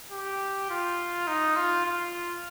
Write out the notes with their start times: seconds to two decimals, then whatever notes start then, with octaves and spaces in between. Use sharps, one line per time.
0.11 G4
0.70 F4
1.27 D#4
1.56 F4
1.85 F4